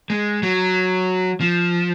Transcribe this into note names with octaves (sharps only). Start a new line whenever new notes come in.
G#3
F#3
F3